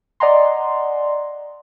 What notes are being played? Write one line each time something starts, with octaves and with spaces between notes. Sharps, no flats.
D5 D#5 F#5 G#5 A#5 C6